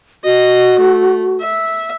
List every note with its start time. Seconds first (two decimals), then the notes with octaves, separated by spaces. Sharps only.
0.24 F#4 D#5
0.79 A3
1.41 E5